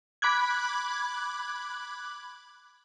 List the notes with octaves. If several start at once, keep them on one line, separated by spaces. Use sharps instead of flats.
B5 D6 F#6 G#6